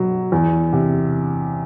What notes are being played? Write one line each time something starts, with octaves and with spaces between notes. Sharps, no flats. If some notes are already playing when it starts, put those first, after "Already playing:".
Already playing: B2 F#3
E2
C3